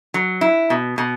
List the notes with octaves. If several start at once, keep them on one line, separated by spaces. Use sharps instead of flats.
F#3
E4
B2
B2